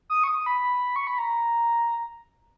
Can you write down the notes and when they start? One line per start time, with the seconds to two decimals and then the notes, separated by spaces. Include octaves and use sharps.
0.10 D#6
0.24 C#6
0.28 D#6
0.46 B5
0.96 C#6
1.07 B5
1.18 A#5